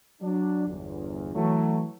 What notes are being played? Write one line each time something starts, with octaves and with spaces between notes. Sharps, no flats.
F#3 D4
G1 E2
E3 F#3 A3